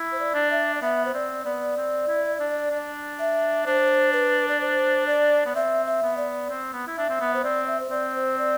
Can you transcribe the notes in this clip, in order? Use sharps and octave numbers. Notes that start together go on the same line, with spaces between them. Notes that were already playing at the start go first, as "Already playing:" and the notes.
Already playing: E4
C5
D5
D4
E5
D5
B3 E5
C5
C4 D5
B3 D5
C4
E4
D4
D4
E5
D4 C5
B4
D5
C5
D5
B3
C4 E5
E5
B3
D5
C4
B3
E4
D4 E5
C4
B3
C5
C4 D5
E5
C5
C4 D5
C5
D5